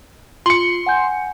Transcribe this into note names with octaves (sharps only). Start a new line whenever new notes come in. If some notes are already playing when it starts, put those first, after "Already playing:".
F4 C6 C#7 F#7
F#5 G#5 G6